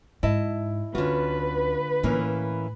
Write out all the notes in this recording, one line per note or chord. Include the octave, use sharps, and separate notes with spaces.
G#2 E4 D#5 A5
D2 D3 C#4 F4 F#4 B4
A2 E3 A#3 C#4